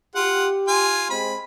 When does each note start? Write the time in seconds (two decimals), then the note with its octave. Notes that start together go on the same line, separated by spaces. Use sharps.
0.15 F4 G4 F#5
0.68 F4 G#5
1.10 G#3 C4 B5